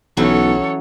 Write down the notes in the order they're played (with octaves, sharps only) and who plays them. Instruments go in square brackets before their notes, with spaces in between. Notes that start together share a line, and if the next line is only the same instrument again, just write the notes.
[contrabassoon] B1 [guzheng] E3 F#3 C#4 [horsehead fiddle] A4 C#5